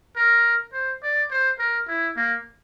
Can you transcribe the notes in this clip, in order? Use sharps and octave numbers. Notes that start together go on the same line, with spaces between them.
A#4
C5
D5
C5
A#4
E4
A#3